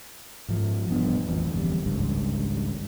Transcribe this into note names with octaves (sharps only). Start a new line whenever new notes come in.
G#2 F3
E1 G3 B3 D4
A1 F2
G1 E2 B2 G3
G#1 C#2 G2